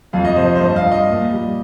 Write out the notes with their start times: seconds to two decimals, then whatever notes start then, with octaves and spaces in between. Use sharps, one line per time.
0.13 F2 F5
0.25 D#5
0.36 C3 F3 C5
0.55 G2 C5
0.66 D#5
0.76 F5
0.85 F3
0.92 D#5
1.08 A#2
1.31 G3